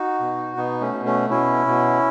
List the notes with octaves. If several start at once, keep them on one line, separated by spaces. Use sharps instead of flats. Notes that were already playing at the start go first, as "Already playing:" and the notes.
Already playing: D#4 F#4
B2
B2 B3 D#4
A3 C#4
B2
A3 C#4
B2 C#4 E4
B2